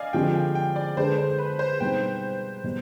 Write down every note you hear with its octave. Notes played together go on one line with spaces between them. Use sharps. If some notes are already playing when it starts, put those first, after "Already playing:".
Already playing: D5 D#5 F5 G#5
D3 F3 G#3 C4 G4 G5
G5
G5
D5
D3 G#3 D4 G#4 B4 C5
C5
B4
C5
B2 G3 C4 D#4 G5
B2 G3